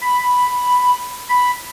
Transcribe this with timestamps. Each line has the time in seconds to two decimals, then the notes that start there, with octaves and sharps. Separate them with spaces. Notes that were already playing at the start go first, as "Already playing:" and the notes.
0.01 B5
1.29 B5